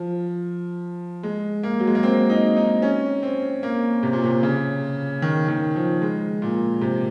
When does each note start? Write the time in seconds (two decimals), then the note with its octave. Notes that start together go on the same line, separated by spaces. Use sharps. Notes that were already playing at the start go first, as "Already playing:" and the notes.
Already playing: F3
1.23 G#3
1.63 A#3
1.80 F#3
1.87 G#3
1.95 A#3
2.03 C4
2.30 D#4
2.56 D#4
2.82 C#4
3.23 C4
3.63 A#3
4.03 C3
4.13 A#2
4.24 C3
4.43 C#3
5.22 D#3
5.48 D#3
5.76 F3
6.02 G#3
6.42 A#2
6.81 C3